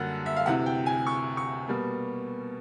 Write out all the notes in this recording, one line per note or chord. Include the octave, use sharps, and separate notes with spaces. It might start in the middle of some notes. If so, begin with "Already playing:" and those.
Already playing: F#2 D3 G3 A#3 F#5
E5
F5
D2 C3 E3 F#5
G5
G#5
C#6
C#6
B2 G3 A#3